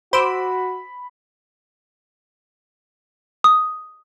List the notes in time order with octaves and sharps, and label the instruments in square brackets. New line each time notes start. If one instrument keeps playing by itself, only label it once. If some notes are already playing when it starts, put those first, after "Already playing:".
[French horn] F#4 [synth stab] C5 D6 E6 [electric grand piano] B5
[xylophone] D#6